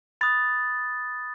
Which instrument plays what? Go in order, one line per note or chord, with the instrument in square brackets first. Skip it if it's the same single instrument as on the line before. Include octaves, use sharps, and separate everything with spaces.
[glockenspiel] B5 D#6 F#6 A6